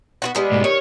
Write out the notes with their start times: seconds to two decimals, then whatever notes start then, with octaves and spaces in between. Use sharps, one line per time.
0.22 B3 F4 F#4
0.35 G3 G#3 B3
0.52 G#2 B2
0.64 D#3 C#5